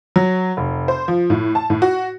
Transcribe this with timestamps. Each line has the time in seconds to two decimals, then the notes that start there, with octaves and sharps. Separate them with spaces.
0.16 F#3
0.57 F1
0.88 C5
1.08 F3
1.30 A2
1.55 A5
1.70 A2
1.82 F#4